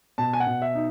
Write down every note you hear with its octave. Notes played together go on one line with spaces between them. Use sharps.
B2 A5
G#5
F#5
B2
E5
D#4